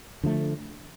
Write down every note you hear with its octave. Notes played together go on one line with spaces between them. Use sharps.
D3 F3 A3